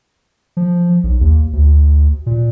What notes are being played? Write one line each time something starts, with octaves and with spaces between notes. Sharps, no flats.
F3
B1
D#2
D2
A#2